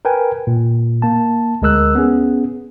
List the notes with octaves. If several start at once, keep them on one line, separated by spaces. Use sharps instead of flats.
A#4 B4 G5 G#5
A#2
A#3 A5
D2 G#3 A#4 E6 F#6
B3 C#4 G#4